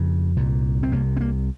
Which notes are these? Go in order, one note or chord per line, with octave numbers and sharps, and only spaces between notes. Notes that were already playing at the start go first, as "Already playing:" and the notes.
Already playing: F2 C#3
C2 A#2
C4
C2 C3 A#3
C4
A#3